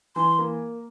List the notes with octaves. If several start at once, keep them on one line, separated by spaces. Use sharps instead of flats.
E3 C6
A#3